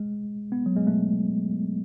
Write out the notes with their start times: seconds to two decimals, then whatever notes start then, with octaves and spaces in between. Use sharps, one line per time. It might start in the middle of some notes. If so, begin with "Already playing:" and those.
Already playing: G#3
0.52 B3
0.66 F#3
0.76 G#3
0.87 A3